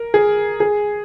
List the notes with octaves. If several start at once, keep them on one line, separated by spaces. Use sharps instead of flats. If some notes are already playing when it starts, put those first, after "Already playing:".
Already playing: A#4
G#4
G#4